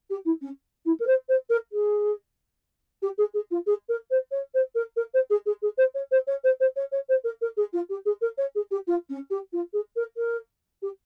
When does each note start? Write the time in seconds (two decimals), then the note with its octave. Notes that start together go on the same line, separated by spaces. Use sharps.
0.10 G4
0.25 E4
0.41 C#4
0.85 E4
1.00 A#4
1.07 C5
1.29 C5
1.50 A#4
1.72 G#4
3.02 G4
3.18 G#4
3.34 G#4
3.51 F4
3.66 G#4
3.89 A#4
4.11 C5
4.31 C#5
4.54 C5
4.75 A#4
4.96 A#4
5.14 C5
5.30 G#4
5.46 G#4
5.62 G#4
5.78 C5
5.94 C#5
6.11 C5
6.27 C#5
6.44 C5
6.60 C5
6.76 C#5
6.92 C#5
7.09 C5
7.24 A#4
7.41 A#4
7.57 G#4
7.73 F4
7.89 G4
8.05 G#4
8.21 A#4
8.38 C#5
8.55 G#4
8.71 G4
8.87 F4
9.09 C#4
9.30 G4
9.52 F4
9.73 G#4
9.96 A#4
10.17 A#4
10.82 G4